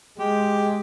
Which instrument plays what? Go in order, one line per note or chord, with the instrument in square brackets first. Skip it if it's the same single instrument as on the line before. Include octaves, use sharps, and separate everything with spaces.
[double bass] G#3 [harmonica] G4